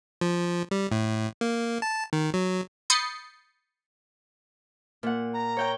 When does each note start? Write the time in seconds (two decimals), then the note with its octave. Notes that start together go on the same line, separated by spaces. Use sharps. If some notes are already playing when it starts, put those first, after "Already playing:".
0.21 F3
0.71 G3
0.92 A2
1.41 A#3
1.82 A5
2.13 D#3
2.34 F#3
2.90 B5 D#6 G6 A6 C7 C#7
5.03 A#2 F#5
5.34 A#5
5.57 C#5 G5 G6